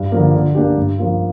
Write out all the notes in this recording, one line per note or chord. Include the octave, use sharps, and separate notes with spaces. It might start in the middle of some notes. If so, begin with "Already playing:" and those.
Already playing: G2
D3 F3 A#3
D3
A#3 D4 G4
G2
F3 A#3 F4